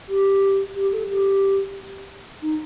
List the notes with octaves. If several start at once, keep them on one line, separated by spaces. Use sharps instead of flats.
G4
G4
A4
G4
D#4